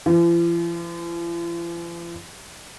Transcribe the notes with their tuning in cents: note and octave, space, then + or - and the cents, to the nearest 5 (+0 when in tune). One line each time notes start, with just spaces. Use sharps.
F3 -45